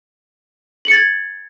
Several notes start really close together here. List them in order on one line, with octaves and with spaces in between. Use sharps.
F#7 C#7 A6 G#6